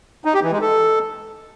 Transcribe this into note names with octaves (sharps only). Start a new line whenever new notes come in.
D#4
G4
E3
G#3
A4